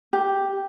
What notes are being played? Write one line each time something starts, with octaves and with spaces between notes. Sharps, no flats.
G4